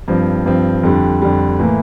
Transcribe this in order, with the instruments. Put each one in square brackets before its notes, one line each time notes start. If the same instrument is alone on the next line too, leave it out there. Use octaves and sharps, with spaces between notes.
[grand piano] G2 F3 C4
G2 F3 C4
F2 D3 G3
F2 D3 G3
A2 E3 A#3